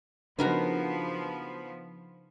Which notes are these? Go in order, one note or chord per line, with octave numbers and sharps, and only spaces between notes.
C#3 F3 B3 D4 D#4 F#4 A#4 B4